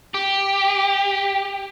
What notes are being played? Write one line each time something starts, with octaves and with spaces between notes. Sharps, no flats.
G4